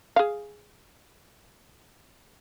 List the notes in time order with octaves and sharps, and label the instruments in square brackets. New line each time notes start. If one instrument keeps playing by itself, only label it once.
[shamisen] G#4 F5